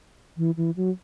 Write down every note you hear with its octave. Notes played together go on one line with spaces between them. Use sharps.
E3
E3
F#3